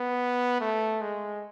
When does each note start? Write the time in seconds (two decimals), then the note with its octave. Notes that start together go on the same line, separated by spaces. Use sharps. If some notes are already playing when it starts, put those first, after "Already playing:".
Already playing: B3
0.60 A3
1.01 G#3